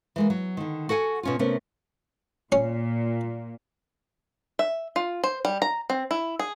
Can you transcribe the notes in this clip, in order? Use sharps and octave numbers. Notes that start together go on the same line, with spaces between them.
E3 G#3 A#3
F#3
D3 D#3
F#4 A4 F#5 G#5
B2 C#4 F4
C3 A3 B3 C#4 A#4
A#2 C#4
E5
F4
C5
G3
A#5
C4
E4
G#4